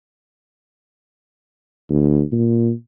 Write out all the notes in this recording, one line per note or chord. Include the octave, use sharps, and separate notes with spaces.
D2
A#2